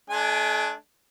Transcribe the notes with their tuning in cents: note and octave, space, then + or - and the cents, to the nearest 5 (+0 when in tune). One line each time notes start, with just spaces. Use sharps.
A3 -45 D4 +0 G#5 +0